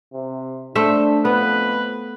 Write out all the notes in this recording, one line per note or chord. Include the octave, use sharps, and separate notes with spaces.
C3
A3 D4 C5 E5
F2 B3 B4